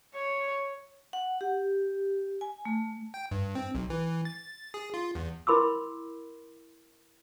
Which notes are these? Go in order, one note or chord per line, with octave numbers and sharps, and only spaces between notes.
C#5
F#5
G4
G#5
A3
G5
G2
C4
B1
E3
A6
G#4
F4
E2
E4 A#4 B5 C6 D6 E6